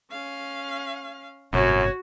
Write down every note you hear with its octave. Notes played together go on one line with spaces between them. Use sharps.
C#4 F5
G1 F#2 A2 C3 F#4 C#5